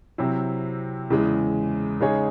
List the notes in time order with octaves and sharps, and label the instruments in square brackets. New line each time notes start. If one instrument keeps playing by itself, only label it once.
[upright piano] C3 F#3 C4 E4
E2 C#3 E3 G#3
C#3 G#3 D#4 G#4 C#5